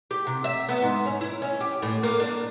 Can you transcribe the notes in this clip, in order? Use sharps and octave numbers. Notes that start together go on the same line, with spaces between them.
G4
C3
E5
B3
G#2
C#4
E4
C#4
G4
A2
A#3
D4